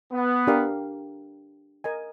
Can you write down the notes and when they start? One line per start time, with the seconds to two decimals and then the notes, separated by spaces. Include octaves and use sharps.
0.13 B3
0.47 D4 G4 A#4 D5 F5
1.84 A#4 D#5 G#5